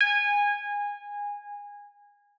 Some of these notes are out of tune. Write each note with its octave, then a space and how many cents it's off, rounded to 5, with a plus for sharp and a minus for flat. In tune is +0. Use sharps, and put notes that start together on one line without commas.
G#5 -20